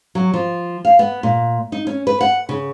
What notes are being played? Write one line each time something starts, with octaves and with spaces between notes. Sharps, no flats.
F#3
F3
F5
B3
A#2
D#4
C#4
B4
F#5
C#3